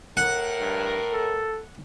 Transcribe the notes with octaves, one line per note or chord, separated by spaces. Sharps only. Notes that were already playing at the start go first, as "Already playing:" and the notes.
A2 A#4 F#5
G2
A4